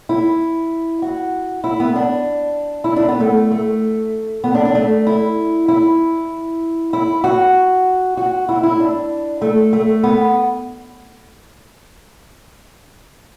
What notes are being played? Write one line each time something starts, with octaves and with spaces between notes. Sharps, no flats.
E4
F#4
E4
B3
D4
E4
D4
B3
A3
A3
B3
D4
D4
A3
E4
E4
E4
F#4
F#4
E4
E4
D4
A3
A3
B3